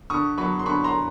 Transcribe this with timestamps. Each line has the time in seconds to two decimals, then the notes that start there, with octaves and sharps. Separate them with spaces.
0.10 D3 C#6 D#6
0.38 F#3 B5 C#6
0.59 C6
0.65 D3 B5 C#6
0.84 A#5 C6